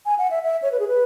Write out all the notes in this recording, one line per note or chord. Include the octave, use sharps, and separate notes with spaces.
G#5
F#5
E5
E5
C#5
B4
G#4
B4